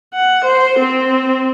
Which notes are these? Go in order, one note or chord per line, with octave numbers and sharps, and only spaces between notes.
F#5
C5
C4